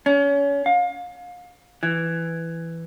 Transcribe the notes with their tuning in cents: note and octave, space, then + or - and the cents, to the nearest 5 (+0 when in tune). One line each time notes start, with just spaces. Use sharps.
C#4 +30
F5 +30
E3 +10